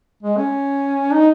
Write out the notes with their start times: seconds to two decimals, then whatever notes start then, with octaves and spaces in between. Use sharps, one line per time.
0.23 G#3
0.38 C#4
1.13 D#4